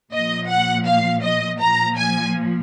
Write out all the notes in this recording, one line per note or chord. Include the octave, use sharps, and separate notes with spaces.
A#2 F3 D#5
F#5
F5
D#5
A#2 F3 A#5
G#5